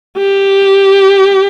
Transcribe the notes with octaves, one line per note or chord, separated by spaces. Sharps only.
G4